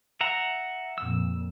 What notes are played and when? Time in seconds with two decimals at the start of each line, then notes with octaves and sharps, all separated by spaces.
0.21 E5 F#5 A#5
0.98 F2 A#2 E6